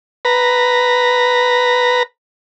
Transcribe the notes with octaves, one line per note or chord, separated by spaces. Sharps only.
B4 A#5